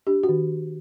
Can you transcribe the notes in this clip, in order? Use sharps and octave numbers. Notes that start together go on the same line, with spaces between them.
D4 G4
F#4
D#3